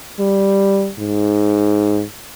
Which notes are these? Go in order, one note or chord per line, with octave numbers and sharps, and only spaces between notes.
G3
G#2